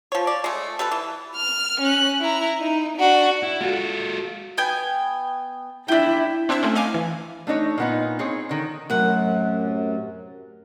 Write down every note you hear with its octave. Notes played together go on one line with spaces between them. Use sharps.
F3 C#5
D5
G#3 A3
G3 A4 B4
E3
F6
C#4 F#6
E4 A#5
D#4
D4 F#4
E4
G#3 F4 F#4 A4
B3 G5 G#5
D4 E4 G4 E5
C4 D4 E4 C5 E5
A3 C4 C#4
D#5 F5 G#5 D6
E3
A3 D4 D#4 C#5
A#2 B3 D#4
C4 D#4 G#4 C#5
D3 D#3
F#2 A2 C3 F#3 A#4 F#5